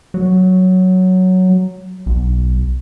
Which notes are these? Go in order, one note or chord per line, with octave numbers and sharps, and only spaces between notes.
F#3
B1